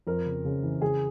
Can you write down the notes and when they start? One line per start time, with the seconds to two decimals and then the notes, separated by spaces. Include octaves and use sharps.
0.07 F2 A#4
0.26 C#3
0.45 C#3
0.63 E3
0.82 C#3 G#4